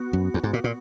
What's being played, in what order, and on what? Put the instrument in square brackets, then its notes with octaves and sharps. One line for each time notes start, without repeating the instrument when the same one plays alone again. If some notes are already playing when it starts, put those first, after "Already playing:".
Already playing: [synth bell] B3 F#4
[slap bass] F#2
E2
G#2
A#2
A#2